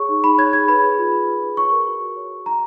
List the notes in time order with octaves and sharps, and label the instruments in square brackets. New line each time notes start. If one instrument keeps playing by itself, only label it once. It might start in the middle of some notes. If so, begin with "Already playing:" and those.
Already playing: [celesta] G#4 C#5 C#6
D#4
D#4 B5
C#5 G#6
G#4 G#6
B4 B5
G#4
F4
F4
B4
G#4
C#5 C#6
A#4
F#4
F#4
C#5
A#4
C#5 A#5